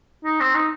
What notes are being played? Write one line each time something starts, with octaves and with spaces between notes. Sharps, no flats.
D#4
C4
D#4